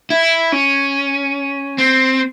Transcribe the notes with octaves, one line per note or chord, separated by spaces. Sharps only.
E4
C#4
C4